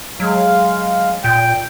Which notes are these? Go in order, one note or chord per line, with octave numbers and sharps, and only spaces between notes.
F#3 G#3 F5
A#2 G5